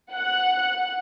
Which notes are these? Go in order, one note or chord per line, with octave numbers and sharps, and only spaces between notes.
F#5